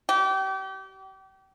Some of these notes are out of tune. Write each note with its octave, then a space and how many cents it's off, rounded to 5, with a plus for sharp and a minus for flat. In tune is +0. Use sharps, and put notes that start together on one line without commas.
G4 -35